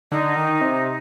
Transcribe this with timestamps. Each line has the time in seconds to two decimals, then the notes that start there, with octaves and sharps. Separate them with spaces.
0.12 D3 D#4
0.36 D#3
0.61 C3